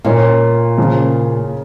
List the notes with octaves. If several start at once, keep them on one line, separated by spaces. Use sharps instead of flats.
A#2 A#3 C#4 F4
C#3 F3 A#3